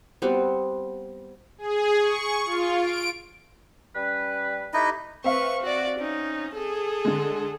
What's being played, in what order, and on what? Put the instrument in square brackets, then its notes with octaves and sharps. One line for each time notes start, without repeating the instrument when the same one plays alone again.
[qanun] G3 B3 C4 F#4
[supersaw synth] G#4
C#6
F4
D7
[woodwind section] G3 C#4 B4
[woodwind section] A3 G4 B4 [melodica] D#4 E4 D#5
[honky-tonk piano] C4 E5 F5 [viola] B4 C#6
[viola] F#4 D5
C#4 D#4
G#4 A4
[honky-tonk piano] D3 G#3